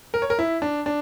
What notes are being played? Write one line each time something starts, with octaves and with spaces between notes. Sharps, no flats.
A#4
C#5
A#4
E4
D4
D4